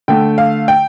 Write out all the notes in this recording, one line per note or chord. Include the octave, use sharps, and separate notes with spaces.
D3 A3 G5
F5
G5